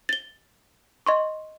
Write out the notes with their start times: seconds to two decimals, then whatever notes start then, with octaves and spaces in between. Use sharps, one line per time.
0.09 A6 G7
1.06 D#5 C6 C#6